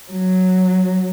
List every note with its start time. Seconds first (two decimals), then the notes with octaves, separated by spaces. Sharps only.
0.11 F#3